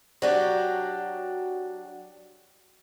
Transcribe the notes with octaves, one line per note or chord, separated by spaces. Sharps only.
F#3 D4 G4